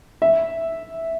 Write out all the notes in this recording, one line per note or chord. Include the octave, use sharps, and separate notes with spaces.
E5